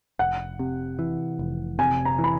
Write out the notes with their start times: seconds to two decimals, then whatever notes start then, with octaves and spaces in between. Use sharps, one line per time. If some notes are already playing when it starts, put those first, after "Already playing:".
0.19 F1 F#5
0.59 C3
0.99 E3
1.39 F1
1.79 C3 G#5
2.05 A#5
2.19 E3
2.24 B5